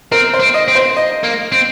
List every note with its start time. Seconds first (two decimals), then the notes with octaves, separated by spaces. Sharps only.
0.12 C4 A#4
0.34 C5
0.40 C4
0.54 D#5
0.68 C4
0.75 C5
0.97 D#5
1.23 A#3
1.52 C4